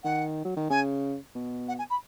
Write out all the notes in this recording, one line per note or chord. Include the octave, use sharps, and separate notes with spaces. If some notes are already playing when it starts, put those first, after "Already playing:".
D#3 F#5
F#3
D#3
C#3 G#5
B2
F#5
G#5
B5